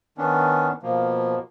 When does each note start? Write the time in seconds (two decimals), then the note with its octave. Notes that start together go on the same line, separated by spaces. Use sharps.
0.18 D#3 B3 C#4 D4
0.83 B2 F3 A#3